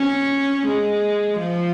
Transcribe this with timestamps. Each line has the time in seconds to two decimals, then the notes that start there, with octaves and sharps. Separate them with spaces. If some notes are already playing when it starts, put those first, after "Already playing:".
Already playing: C#4
0.66 G#3
1.38 F3